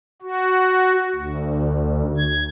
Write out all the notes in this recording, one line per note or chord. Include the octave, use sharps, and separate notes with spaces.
F#4
D2
G#6